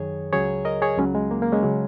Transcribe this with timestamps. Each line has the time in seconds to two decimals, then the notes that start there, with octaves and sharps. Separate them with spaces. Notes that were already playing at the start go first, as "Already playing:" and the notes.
Already playing: F#2 D#3 F#3 G#4 C#5
0.33 C#2 C#3 F#3 G#4 C#5
0.65 A#4 D#5
0.82 G#4 C#5
0.98 C#2 C#3 F#3 G#3 C#4
1.15 G#3
1.31 A#3
1.42 A#3
1.52 G#3 C#4
1.63 C#3 F#3